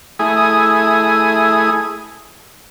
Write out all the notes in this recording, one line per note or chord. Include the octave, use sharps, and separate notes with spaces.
A3 E4 G#4 G#5 D#6